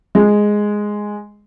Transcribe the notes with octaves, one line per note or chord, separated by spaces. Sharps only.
G#3